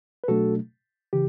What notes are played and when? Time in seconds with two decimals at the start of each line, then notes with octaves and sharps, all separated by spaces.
0.24 B4
0.28 B2 F#3 A3 D4 F#4 A4
1.13 C#3 E3 G4